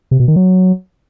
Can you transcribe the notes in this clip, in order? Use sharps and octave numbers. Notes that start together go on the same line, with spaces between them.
C3
B2
D#3
F#3